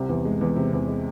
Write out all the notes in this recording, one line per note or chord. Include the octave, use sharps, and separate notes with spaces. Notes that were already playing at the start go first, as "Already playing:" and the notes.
Already playing: C2 C3
E2
G#3
E2
C3
E2
G#3